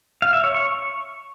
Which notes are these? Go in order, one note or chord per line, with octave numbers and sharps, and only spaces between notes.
F5
E5
C#5
C#6